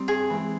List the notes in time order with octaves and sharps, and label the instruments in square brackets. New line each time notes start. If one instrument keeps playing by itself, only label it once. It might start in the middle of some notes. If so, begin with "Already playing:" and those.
Already playing: [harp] G3 C4 D#4
[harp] G2 [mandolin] G#4
[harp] E3 G#3 C4